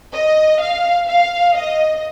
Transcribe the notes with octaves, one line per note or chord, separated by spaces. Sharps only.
D#5
F5
F5
D#5